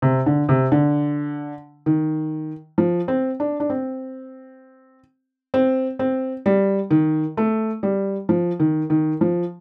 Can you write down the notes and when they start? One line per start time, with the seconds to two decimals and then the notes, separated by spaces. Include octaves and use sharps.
0.02 C3
0.26 D3
0.49 C3
0.72 D3
1.86 D#3
2.78 F3
3.08 C4
3.40 D4
3.60 D4
3.70 C4
5.54 C4
5.99 C4
6.46 G3
6.91 D#3
7.37 A3
7.83 G3
8.29 F3
8.60 D#3
8.90 D#3
9.21 F3